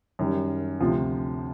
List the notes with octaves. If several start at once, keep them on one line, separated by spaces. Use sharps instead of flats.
F#2 D#3 G3
D2 C3 F3